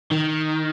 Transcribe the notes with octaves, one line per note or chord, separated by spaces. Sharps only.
D#3